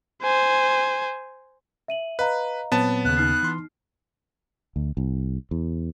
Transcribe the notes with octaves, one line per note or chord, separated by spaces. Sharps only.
C5 G#5
E5 D#7 F#7
B4 D#5 F5 A#5
A#2 F#3 B3 C4 C#5 A5
D#2 C#3 F#6
D#4 F6 C7
E3 C6
D2
C2
E2